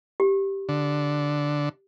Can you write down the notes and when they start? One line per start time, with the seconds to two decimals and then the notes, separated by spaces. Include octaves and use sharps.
0.20 G4
0.69 D3